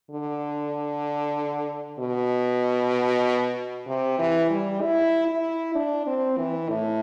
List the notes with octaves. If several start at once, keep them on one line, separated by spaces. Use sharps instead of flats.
D3
B2
C3
E3
G3
E4
E4
D4
C4
E3
A2